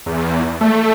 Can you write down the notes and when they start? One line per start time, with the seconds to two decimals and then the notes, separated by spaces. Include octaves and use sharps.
0.06 E2
0.61 A3